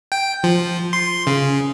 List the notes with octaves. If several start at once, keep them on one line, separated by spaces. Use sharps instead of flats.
G5
F3
C6
C#3